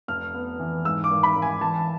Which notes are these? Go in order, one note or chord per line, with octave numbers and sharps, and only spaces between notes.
F1 F6
B3
E3
G#2 E6
D6
G#1
B5
G#1
G#5
E3 A5